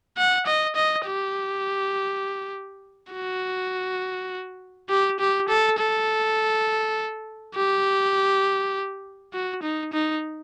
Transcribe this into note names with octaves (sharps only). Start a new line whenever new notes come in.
F#5
D#5
D#5
G4
F#4
G4
G4
A4
A4
G4
F#4
D#4
D#4